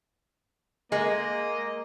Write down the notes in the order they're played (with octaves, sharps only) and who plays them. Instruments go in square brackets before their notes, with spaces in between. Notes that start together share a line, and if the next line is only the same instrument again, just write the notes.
[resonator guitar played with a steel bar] G#3 [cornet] A#3 [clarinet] D#5